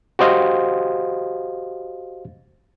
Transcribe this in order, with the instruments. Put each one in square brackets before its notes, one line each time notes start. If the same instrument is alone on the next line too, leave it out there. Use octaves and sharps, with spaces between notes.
[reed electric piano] F#4 G4 C5 D#5 F5